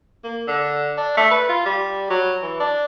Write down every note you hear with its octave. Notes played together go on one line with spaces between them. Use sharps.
A#3
D3
D4
A3
B4
F4
G3
F#3
E3
D4